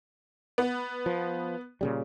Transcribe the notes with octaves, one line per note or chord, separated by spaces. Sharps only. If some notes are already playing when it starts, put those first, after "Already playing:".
B3
F3
A#2 C#3 G3